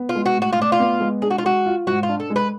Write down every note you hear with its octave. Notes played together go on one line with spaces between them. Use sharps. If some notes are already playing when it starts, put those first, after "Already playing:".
Already playing: B3
F4
G#3
F#4
A2 F#4
F4
A2 D4
F4
B3
G#3
D4 G#4
F#4
F4
G#3 F#4
F4
G#2 F#4
F4
D4
A4
G#3
B4